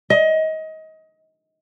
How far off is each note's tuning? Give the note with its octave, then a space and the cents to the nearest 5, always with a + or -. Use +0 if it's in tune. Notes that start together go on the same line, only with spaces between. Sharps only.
D#5 +25